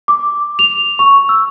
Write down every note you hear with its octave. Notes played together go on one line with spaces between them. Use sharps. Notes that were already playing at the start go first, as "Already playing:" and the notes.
D6
F7
C#6
E6